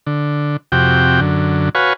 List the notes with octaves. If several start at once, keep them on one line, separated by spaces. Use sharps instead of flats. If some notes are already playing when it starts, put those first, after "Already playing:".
D3
F2 C3 F#4 G4 G5
F#2 D3
F#4 B4 C#5 F5 G#5